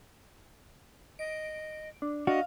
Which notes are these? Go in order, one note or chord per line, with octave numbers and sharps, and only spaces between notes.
D#5 D7
D4
D4 F#4 D#5 F5